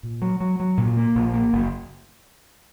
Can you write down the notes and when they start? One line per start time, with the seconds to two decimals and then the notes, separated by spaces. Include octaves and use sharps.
0.03 A#2
0.22 F#3
0.40 F#3
0.60 F#3
0.78 A#2
0.97 A#3
1.15 A#1
1.34 A#3
1.53 F#1